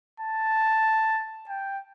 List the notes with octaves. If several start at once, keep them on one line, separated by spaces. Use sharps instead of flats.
A5
G5